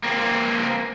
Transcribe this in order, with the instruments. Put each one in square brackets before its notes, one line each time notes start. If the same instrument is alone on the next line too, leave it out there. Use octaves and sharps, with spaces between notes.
[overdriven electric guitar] A#3 C4